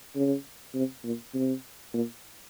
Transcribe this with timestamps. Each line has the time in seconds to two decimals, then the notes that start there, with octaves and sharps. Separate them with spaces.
0.15 C#3
0.75 C3
1.04 A#2
1.34 C3
1.93 A#2